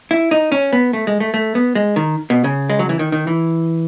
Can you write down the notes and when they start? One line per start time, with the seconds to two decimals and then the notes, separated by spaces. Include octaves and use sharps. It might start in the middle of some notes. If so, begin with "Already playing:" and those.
0.11 E4
0.31 D#4
0.52 C#4
0.73 B3
0.93 A3
1.07 G#3
1.20 A3
1.34 A3
1.55 B3
1.75 G#3
1.96 D#3
2.30 B2
2.44 C#3
2.70 G#3
2.79 F#3
2.89 E3
2.99 D#3
3.12 D#3
3.27 E3